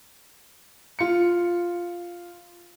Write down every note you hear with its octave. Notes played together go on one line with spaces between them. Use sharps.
F4 C#7